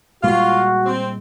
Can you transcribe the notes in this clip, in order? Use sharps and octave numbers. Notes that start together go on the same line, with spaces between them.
A#2 G3 G#3 F4 F#4 F5
C4